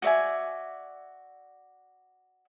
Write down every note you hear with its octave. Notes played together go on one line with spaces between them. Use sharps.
F#4 D5 E5 G#5